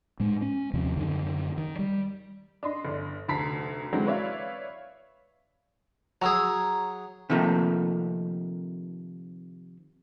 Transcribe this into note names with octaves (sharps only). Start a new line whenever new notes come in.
A2 G#3
C#4
D#2 C3 F3
F#2 D3 D#3
D#3
G3
D4 D#5 C6
G1 D4
F1 D2 A5 A#5 B6 C7
D3 E3 F#3 G#3 C4
B4 C#5 D5 E5 F5
F#3 G#4 A#5 E6
C3 D#3 F3 A3 A#3